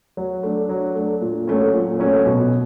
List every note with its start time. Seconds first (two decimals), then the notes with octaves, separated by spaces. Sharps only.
0.17 F#3
0.43 A3 D4
0.69 F#3
0.95 A3 D4
1.21 A#2
1.47 F#3 A3 C#4
1.74 A#2
1.99 F#3 A3 C#4
2.26 B2